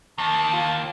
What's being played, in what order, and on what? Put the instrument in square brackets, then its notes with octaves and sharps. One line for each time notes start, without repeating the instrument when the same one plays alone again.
[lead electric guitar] D#2 [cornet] A5
[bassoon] F4